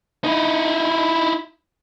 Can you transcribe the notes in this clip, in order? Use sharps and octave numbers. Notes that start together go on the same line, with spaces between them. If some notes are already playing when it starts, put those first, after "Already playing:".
D#4 E4